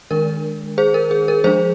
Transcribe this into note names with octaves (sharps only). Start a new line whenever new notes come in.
D#3 G#3 D4 A#4
G#4 C5
A#4
G#4
A#4
F3 G#3 D4 G#4 C5